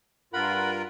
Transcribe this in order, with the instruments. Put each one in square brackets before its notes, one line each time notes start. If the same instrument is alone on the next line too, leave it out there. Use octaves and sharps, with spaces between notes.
[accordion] G2 F4 A#4 [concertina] F#5 B5